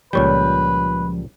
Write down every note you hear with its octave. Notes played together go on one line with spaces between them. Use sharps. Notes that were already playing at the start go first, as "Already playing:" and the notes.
C#2 A#2 F3 G3 B4 C#5 G6